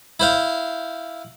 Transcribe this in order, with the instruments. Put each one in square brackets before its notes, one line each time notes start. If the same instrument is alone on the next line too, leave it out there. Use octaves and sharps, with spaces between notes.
[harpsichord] E4 C5 F5